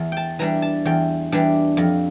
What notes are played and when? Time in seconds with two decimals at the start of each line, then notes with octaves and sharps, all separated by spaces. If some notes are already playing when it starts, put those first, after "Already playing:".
Already playing: E2
0.12 G5 A5
0.39 E3 G3 D4 A#5
0.62 A5
0.85 E2 G5
1.32 E3 G3 D4
1.77 F2